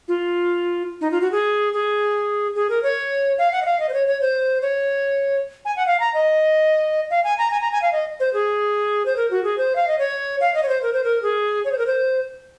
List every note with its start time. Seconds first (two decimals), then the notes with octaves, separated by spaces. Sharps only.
0.08 F4
1.01 D#4
1.11 F4
1.21 F#4
1.32 G#4
1.73 G#4
2.55 G#4
2.70 A#4
2.83 C#5
3.38 F5
3.52 F#5
3.62 D#5
3.65 F5
3.79 D#5
3.89 C5
3.93 C#5
4.07 C#5
4.21 C5
4.62 C#5
5.65 G#5
5.76 F#5
5.87 F5
6.00 A#5
6.14 D#5
7.10 F5
7.24 G#5
7.38 A#5
7.51 G#5
7.61 A#5
7.72 G#5
7.82 F5
7.92 D#5
8.20 C5
8.33 G#4
9.05 C5
9.16 A#4
9.31 F#4
9.44 G#4
9.58 C5
9.76 F5
9.87 D#5
9.99 C#5
10.41 F5
10.54 D#5
10.63 C#5
10.68 C5
10.82 A#4
10.93 C5
11.04 A#4
11.22 G#4
11.65 C#5
11.72 C5
11.78 A#4
11.86 C5